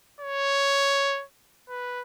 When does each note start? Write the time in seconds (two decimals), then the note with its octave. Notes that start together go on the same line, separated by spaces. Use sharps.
0.20 C#5
1.69 B4